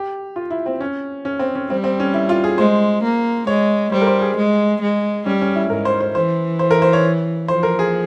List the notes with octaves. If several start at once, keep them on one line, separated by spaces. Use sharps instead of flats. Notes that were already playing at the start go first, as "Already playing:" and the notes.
Already playing: G4
F4
E4
C4
C#4
C#4
C4
C#4
G3 C4
C4
C#4
E4
F4
G#4
G#3 C5
A#3
G#3 C#5
G3 C5
A#4
C5
G#4
G#3
G#3
G3 C#4
C#4
E4
G#2 A#4
C5
C5
E3 C5
C5
A#4
C5
C#5
F3 C5
A#4
G#4